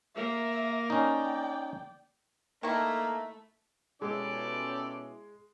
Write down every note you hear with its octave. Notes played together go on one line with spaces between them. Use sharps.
A#3 A#4 E5
C#4 D#4 D5 G5
D#3 A3 A#3 E4 E5 A#5 F6
B2 G#3 C#4 E4 G4 A4 D5